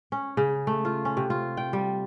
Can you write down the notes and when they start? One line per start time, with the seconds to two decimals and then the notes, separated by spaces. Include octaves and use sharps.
0.12 C#4
0.37 C#3
0.67 A3
0.85 F4
1.05 C#4
1.17 C3
1.30 F4
1.57 G5
1.73 G3